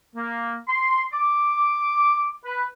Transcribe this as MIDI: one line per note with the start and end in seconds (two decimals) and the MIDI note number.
0.16 0.58 58
0.68 1.04 84
1.12 2.32 86
2.45 2.66 71